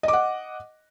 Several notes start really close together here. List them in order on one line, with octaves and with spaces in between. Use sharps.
D#5 D6 F#5